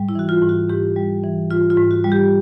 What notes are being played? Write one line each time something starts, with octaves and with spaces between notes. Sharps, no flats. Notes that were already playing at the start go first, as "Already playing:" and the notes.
Already playing: G#2 G3
E4
E3 F#4
F4
G#2
F#4
G#2 G4
G3
E3
G#2 F4
F4
G#2
F#4
G3
G4